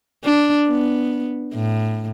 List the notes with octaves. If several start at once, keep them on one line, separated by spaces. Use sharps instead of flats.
D4
B3
A2